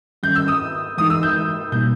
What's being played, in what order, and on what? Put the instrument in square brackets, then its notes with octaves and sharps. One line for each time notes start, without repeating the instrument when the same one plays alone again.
[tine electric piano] D#3 G3 C#4 [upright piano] G6
[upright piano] E6
D#6
[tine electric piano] E3 G#3 D#4 [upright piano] D#6
[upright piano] E6
G6
[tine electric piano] B2 G3 A#3 D#4 [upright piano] G6